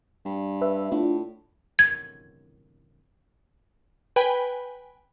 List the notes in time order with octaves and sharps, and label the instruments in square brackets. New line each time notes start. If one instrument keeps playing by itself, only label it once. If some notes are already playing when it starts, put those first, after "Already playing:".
[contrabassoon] G2
[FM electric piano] B4 E5
[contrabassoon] A2 [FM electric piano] D4 F4
[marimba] G#6
[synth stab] B4 G5 G#5 B5